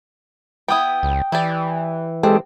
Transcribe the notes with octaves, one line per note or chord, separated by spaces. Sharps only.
B3 E4 G5 D#6
C#2
E3 E4 G4 D5
G#3 C4 G4 A4